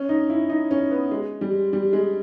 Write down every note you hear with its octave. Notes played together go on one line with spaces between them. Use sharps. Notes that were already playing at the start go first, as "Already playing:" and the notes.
Already playing: C#4
D#4
E4
D#4
C#4
B3
G#3
G3
G3
G#3